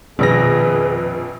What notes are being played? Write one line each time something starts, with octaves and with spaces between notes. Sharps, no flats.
A#1 F2 B2 D#3 C#4 G#4 B4 A#6